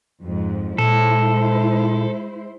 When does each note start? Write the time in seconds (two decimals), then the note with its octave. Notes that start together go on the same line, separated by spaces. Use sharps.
0.21 F2 G#2
0.78 A#2 G#3 E4 A4 C5